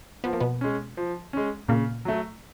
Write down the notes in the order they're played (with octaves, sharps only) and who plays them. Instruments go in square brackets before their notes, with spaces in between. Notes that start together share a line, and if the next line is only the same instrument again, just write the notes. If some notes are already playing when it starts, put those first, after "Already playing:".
[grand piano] F3 [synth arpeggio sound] B3
[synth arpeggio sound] A#3
B2 B3
[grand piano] G#3 C#4
F3
G#3 C#4
[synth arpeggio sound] A#2 A#3 [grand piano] C#3
[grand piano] F#3 A3